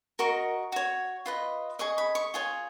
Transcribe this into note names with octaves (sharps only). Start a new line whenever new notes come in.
F#4 A#4 D#5 C#6
F#4 C#5
F4 B4 D#5
G#4 D#5 C#6
B5
C#6
F4 G#4 C#5